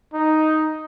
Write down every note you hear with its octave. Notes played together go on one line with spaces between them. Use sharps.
D#4